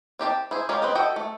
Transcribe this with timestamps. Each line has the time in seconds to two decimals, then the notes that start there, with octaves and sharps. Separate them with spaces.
0.19 C4 G4 D#5 A5
0.51 E4 G#4 C5
0.69 G#3 C#4 F4 G4 A#4
0.82 C4 B4 C5 D#5
0.95 F#4 A4 D#5 E5 G5
1.16 A3